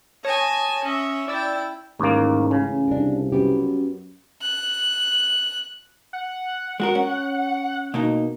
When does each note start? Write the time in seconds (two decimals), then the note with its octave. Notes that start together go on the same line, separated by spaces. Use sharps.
0.24 C#5 G#5 A5 D#6 A#6
0.84 C#4 E5
1.28 E4 D5 G5 E6 A6
2.00 A1 D#2 G#2 A#3
2.51 C#3
2.88 C2 D4 A#4
3.32 F#2 B3 G4
4.42 F#6
6.13 F#5
6.80 G#3 F#4 A#4
6.95 C#4
7.94 B2 A#3 D#4